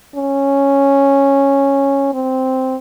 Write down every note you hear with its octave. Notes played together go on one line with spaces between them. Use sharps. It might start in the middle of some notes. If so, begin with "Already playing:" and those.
C#4
C4